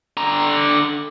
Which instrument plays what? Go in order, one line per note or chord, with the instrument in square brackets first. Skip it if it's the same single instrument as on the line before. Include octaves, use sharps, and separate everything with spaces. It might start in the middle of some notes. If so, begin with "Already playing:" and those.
[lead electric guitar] D3 A#5